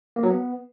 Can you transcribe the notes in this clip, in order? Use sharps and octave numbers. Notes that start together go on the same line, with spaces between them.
A#3
F#3
B3